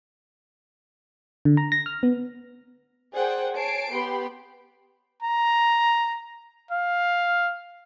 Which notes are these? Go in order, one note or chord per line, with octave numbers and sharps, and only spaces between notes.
D3
A#5
A#6
F6
B3
G#4 A#4 C5 D5 F#5 G5
C#5 G#5 A5 C7 D7
B3 G4 B5 C6
A#5
F5